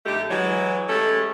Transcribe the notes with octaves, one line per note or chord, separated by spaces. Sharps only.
F2 D3 A3 D#4 G4
E3 F#3 G#3
G#3 A3 C#4 E4 G4 A4